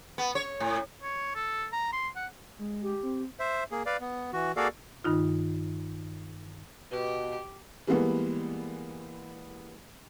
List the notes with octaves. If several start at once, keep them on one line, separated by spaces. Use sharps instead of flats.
B3
C#5
A2
C#5
A4
A#5
C6
F#5
G#3
G4
C4
C5 E5
A#3 G#4
B4 D5 F5
B3
E3 F#4
A#3 F#4 G#4 A4 D5 F5
G2 D#3 D#4 F4
B2 G4
E3 G3 G#3 A#3 B3